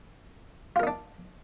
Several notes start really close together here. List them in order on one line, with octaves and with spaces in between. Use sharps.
F4 A#4 D#4 D4